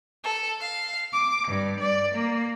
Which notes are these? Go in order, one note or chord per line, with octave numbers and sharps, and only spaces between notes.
A4
F5
D6
G2
D5
A#3